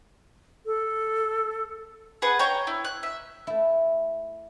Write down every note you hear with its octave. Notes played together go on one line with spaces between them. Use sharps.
A4
G#4 B4 F#5
C#5 G5 A#5
E4
F#6
E5
A3 E4